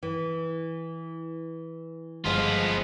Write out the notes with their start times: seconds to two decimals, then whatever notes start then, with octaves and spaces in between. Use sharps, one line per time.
0.03 E3
2.25 G1 F3 G#3 B3 F4